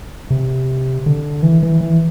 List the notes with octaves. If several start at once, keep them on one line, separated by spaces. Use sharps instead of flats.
C3
D3
E3
E3
E3